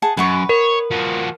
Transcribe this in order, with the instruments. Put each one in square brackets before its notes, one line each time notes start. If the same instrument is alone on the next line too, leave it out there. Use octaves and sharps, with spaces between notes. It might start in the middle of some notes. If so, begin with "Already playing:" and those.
[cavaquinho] G#4 F#5 A5
[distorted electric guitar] F#2 [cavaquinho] B4 F#5 C#6
[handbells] A#4 [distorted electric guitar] C#5
[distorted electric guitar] F3 F#4